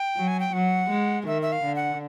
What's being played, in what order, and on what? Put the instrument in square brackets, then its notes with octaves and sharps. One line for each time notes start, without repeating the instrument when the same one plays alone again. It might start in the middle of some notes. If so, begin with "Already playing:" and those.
Already playing: [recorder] G5
[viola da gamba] F#3
[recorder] G#5
G5
[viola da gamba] F#3 [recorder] F#5
[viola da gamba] G#3
[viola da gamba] D#3 [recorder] E5
[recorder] E5
F5
[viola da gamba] D3
[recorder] F#5